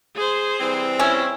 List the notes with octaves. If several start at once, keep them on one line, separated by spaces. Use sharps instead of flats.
G#4 C5
E3 G3 C4
C#4 E4